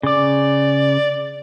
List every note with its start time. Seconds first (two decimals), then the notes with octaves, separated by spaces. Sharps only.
0.03 C#3 D5 D6